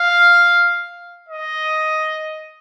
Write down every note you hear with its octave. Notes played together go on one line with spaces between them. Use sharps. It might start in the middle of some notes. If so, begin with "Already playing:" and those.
Already playing: F5
D#5